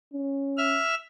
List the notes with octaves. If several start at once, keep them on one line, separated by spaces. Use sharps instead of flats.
C#4
E5 F6